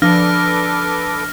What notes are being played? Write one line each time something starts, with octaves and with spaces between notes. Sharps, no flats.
F3 D4 A4 B4 D6 F6 A#6